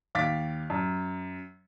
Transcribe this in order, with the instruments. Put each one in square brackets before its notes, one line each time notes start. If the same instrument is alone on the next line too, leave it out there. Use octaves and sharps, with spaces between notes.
[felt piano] D#2 F5 D6 A6 B6
F#2